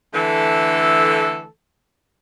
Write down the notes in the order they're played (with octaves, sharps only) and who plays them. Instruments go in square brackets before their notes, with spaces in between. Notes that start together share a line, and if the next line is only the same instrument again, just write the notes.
[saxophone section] D3 E3 A3 A4